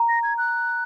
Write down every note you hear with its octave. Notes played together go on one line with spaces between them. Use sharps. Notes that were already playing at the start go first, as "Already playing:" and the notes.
Already playing: A#5
A#6
G#6
F#6